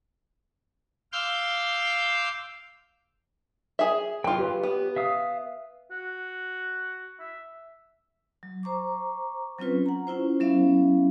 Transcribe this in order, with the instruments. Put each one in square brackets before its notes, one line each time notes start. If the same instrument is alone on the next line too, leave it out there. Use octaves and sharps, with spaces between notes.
[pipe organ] F5 C6 D6 E6 F6 G6
[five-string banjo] G#4 E5
[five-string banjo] F#3 F4 [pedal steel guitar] G5 C6
[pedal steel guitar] G4 B4 C#5
[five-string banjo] B3
[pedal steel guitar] E5 F5 D#6
[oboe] F#4
E5
[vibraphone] F#3
C5 A#5 C#6 D6
F#3 C4 C#4 F4 B4
F#5 A#5
C#4 E4 F4 C5
F#3 B3 C#4 E4 E5 F5